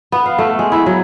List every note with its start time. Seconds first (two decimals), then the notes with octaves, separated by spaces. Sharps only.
0.12 B3
0.26 F5
0.39 A3
0.59 G#3
0.72 E4
0.86 F#3